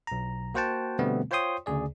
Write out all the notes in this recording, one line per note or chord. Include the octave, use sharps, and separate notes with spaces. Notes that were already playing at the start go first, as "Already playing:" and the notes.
B1 A#5
A#3 F#4 C5 F#5 G5 A5
B2 D3 G3 A3 B3 C4
F4 C5 C#5 G5 C6 D#6
D2 C#3 G#4 D5